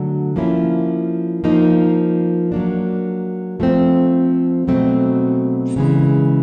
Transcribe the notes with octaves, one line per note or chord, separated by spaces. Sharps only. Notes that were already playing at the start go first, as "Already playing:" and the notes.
Already playing: D3 F#3 A3
F3 A#3 C#4 E4
F3 A#3 D#4
F#3 A#3 D4
F3 A3 C4
B2 F#3 A3 C4
C#3 E3 G#3